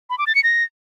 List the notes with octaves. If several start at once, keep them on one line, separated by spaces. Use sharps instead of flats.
B5
D6
A6
C#7
A#6